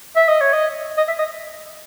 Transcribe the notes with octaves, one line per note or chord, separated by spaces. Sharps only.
E5
D#5
C#5
D#5
D#5
E5
D#5